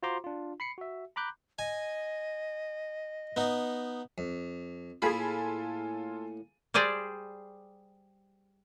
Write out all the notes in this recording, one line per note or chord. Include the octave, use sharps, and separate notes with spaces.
F4 F#4 C5 A#5 C6 D6
D4 F4
B5 C7 C#7
F#4 E5
A#5 B5 D6 F#6 G6
D#5 G#5
B3 D#4
F2
A2 A#3 F4 G#4 A4 G#5 B5
G3 G4 G#4 C5 D5